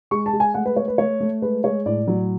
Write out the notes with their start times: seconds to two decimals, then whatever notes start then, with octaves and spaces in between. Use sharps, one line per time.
0.11 G#3 C#6
0.26 A5
0.33 G#3
0.40 G#5
0.54 A3 F#5
0.65 B4
0.76 A3 C#5
0.88 B4
0.98 A3 C#5
1.20 A3
1.42 G#3 B4
1.64 G#3 C#5
1.86 A2 D5
2.08 F#3